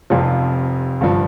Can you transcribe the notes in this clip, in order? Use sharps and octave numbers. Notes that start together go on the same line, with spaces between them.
F1 F2 C3 F3 F4
G1 G2 F3